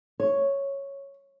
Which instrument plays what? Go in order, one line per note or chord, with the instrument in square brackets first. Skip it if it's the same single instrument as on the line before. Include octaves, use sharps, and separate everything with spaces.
[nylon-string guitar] C#5